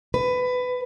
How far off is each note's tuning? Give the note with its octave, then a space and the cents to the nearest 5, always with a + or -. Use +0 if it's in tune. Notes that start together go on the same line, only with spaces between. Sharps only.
B4 +15